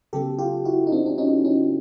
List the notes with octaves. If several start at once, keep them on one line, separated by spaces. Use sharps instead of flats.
C#3 F#3 B3 G4 A4
F4 G4
E4 F#4
D#4
C4 D4
D4
C#4 D#4
C#4 D#4